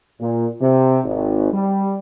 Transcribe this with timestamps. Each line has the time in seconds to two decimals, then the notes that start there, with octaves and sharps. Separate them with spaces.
0.20 A#2
0.61 C3
1.04 G#1
1.53 G3